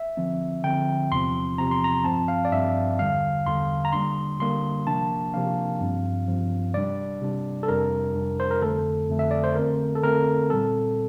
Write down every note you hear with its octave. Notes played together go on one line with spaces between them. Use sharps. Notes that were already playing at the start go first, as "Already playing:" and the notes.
Already playing: E5
D3 F3 C4
D3 F3 C4 G5
E2 C3 F3 C4 C6
E2 C3 F3 C4 A#5
C6
A#5
G2 F3 C4 A5
F5
D5
G2 F3 C4 E5
E2 D3 G3 F5
E2 D3 G3 C6
A#5
D3 G3 A#3 D4 C6
D3 G3 A#3 D4 C6
C3 F3 A#3 D4 A5
C3 F3 A#3 D4 F5
G2 F3 C4
G2 F3 C4
C3 G3 D4 D5
C3 G3 D4
A4
F2 C3 G3 D4 A#4
F2 C3 G3 D4
C5
A#4
F2 D3 A3 A4
F2 D3 A3
E5
D5
C5
D3 A3 C4 A#4
A4
D3 A3 C4 A#4
A#2 G3 C4 A4